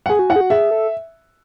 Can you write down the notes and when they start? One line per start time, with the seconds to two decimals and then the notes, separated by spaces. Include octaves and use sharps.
0.06 F#5
0.09 G#4 G#5
0.19 F#4
0.30 E4 F#5
0.36 G#4
0.41 F#4
0.50 G#4 E5
0.71 A4